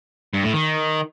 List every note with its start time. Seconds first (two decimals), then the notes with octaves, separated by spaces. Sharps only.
0.33 G2
0.43 A2
0.53 D#3